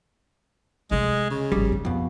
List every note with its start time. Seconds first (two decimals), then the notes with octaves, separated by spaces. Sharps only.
0.91 C3 G#3 A3
1.31 C#3
1.52 G#1 F3 G3
1.72 D#2
1.85 F2 B2